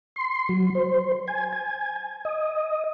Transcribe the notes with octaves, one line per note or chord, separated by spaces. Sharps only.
C6
F#3
C5
G#5
G#5
D#5